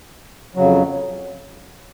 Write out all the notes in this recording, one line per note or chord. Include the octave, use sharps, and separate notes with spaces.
F2 C#3 F#3